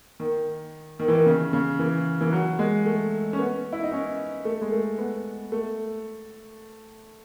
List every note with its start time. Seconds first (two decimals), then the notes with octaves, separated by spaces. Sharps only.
0.20 D#3
0.99 D#3
1.08 E3
1.13 D#3
1.26 C#3
1.53 C#3
1.79 E3
2.21 E3
2.33 F#3
2.59 G#3
2.86 A3
3.33 C#4
3.39 B3
3.73 E4
3.83 D#4
3.92 C#4
4.45 A3
4.61 G#3
4.72 A3
4.98 B3
5.52 A3